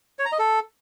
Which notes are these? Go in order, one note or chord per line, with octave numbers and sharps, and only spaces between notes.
C#5
A#5
D#5
A4